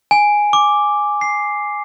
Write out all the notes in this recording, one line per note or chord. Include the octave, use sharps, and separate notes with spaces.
G#5
D6
C7